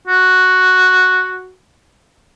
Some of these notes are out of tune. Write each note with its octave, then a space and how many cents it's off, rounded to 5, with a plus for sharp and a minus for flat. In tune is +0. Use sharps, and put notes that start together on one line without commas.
F#4 +0